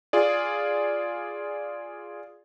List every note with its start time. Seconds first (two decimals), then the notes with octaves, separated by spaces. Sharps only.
0.13 F4 G#4 D5